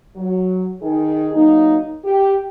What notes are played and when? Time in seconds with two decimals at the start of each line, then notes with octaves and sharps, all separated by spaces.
0.16 F#3
0.82 D#3 D#4 G#4
1.34 F#3 A#3 D#4
2.04 G4